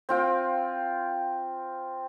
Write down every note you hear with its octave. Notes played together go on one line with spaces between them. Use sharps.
C4 F4 G5